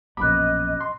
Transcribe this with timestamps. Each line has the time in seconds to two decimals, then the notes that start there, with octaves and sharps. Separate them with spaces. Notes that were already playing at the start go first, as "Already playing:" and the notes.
0.17 A#1 F#2 B2 D#5 B5 D6 F#6
0.81 C6